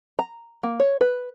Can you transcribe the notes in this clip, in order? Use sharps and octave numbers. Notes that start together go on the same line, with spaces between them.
A#5
A#3
C#5
B4